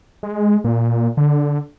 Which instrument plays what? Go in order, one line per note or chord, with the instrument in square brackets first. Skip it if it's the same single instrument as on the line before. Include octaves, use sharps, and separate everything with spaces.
[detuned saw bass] G#3
A#2
D3